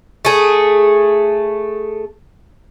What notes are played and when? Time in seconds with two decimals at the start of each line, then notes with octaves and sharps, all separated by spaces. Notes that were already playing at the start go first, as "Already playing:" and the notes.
0.25 A3 G#4